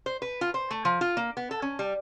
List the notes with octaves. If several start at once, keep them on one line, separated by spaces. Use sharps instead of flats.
C5
B4
F4
C5
A3
F3
F4
A#3
B3
A4
C#4
G3